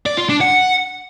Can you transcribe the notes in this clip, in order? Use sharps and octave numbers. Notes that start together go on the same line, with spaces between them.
D5
F4
D4
F#5